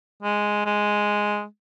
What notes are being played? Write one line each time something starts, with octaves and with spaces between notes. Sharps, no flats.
G#3
G#3